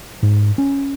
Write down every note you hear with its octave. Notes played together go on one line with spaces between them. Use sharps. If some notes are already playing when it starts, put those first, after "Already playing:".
G#2
C#4